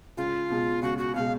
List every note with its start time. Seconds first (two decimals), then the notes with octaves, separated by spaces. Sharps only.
0.17 C#2 F4
0.50 B2 G#3
0.82 C#2 F#4
0.98 F#4
1.15 B2 G#3 F5